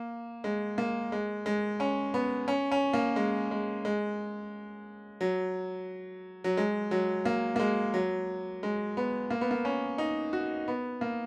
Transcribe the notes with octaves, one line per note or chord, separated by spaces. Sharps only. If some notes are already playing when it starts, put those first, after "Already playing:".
Already playing: A#3
G#3
A#3
G#3
G#3
C#4
B3
C#4
C#4
A#3
G#3
G#3
G#3
F#3
F#3
G#3
F#3
A#3
A#3
G#3
F#3
G#3
B3
A#3
B3
A#3
C#4
D#4
F#4
B3
A#3